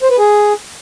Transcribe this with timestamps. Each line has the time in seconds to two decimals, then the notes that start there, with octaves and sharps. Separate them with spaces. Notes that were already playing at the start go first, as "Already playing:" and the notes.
0.02 C5
0.10 B4
0.18 G#4